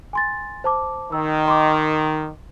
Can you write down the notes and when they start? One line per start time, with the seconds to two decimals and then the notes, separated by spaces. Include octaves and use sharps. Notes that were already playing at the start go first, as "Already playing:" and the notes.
0.13 G#5 C6 A6
0.64 C5 A5 D6
1.12 D#3 E6
1.46 D#5 C6 D6